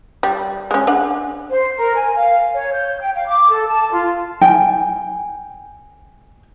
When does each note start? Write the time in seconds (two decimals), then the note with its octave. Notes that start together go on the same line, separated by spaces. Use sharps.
0.23 G3
0.71 G#3 C#4
0.87 D4 F#5
1.49 C5
1.77 A#4
1.95 G#5
2.16 F5
2.54 C#5
2.73 G6
3.00 G5
3.15 F5
3.26 D6
3.51 A4
3.68 A5
3.93 F4
4.41 G5 G#5